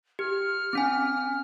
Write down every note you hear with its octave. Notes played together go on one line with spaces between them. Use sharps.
G4 F6
C4 C#4 G#5